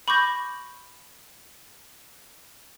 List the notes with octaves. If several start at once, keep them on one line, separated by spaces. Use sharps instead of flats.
B5 C#6 D6 G6 A#6